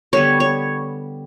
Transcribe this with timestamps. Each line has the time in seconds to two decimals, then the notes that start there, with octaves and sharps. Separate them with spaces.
0.13 D3 G3 B3 C#5
0.40 C#5